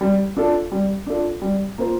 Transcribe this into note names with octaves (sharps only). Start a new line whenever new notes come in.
G3
D4 F4 A4
G3
D4 F4 A4
G3
A#3 F4 C5